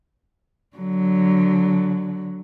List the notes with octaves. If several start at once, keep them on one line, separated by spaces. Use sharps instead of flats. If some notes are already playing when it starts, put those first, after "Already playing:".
D3 F#3